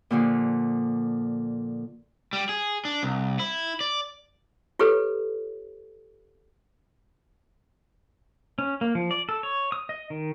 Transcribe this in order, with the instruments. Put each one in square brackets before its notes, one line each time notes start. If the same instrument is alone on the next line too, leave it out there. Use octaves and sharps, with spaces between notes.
[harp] A#2 D3 F3
[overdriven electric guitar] G3
G#4
D4
C2
E4
D5
[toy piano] F4 G4 A4 B4 C#5
[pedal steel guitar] C#4
A#3
F3
D5
A4
C#5
D#6
D#5
D#3